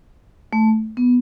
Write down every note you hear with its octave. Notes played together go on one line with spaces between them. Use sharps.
A3
B3